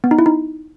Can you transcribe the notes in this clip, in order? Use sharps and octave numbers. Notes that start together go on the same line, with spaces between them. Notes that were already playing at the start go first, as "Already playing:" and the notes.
B3
D#4
E4
D#4